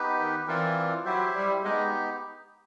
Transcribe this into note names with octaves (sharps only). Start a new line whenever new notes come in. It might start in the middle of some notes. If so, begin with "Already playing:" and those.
Already playing: B3 D#4 G4 B4
D#3
E3 C4 F4 A#4 D5
F#3 E4 G4 C5 E5
G3
G#3 B3 D#4 G4